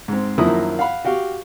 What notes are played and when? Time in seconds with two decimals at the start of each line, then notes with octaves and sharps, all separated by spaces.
0.08 G#2 C4
0.38 F#2 D#3 F3 A#3 E4 D#6
0.79 F5 F#5 B5
1.05 F#4 G4 F5